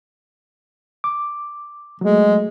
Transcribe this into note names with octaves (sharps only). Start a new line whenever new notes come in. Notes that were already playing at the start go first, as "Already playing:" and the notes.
D6
F#3 G#3 A3